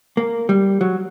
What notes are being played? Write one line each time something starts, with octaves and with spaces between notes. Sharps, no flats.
A#3
G3
F#3